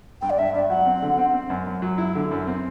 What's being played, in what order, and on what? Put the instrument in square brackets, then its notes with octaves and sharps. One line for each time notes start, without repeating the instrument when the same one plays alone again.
[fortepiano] G2 [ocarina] G5
[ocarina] D5
[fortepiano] G2 [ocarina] E5
[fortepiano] G2 [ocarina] D5
[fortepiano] F#3 [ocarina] F#5
[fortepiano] C4
D3
C4
C4
F#2
F#2
F#3
E4
D3
F#2
C4